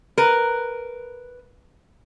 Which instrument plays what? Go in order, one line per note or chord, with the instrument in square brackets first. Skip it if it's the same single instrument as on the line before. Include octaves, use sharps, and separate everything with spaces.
[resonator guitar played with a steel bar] A#4 B4